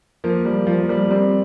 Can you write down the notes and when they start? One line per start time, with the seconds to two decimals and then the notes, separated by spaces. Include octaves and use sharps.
0.24 F3 A#3
0.45 G3
0.67 F3
0.83 A#3
0.89 G3
1.11 G3 C4